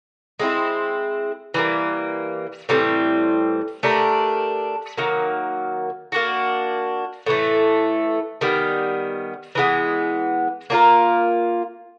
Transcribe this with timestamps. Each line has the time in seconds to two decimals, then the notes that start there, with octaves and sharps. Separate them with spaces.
0.40 G#3 C4 E4
1.54 E3 G3 A#3
2.69 A2 E3 G3 C4
3.83 A3 D4 G4 A#4
4.97 D#3 F#3 A#3
6.12 A#3 D4 F#4
7.26 A2 E3 A3
8.41 D#3 G3 B3
9.55 E3 G#3 B3
10.70 A#3 D4 F4 A#4